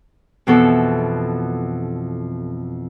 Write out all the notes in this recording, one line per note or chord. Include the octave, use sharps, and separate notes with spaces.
F2 B2 E3 A4